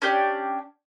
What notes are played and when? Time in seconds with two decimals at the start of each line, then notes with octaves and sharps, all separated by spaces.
0.02 C#4 D4 G4 D5